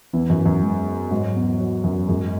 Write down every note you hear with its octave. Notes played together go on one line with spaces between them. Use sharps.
E2 E3
F#2
F#2
G#3
G#2 F#3
E2
F#3
F#2
F#2 G#3